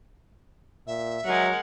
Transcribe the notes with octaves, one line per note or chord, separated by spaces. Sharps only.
A#2 E5
F#3 G#3 A#4 F#5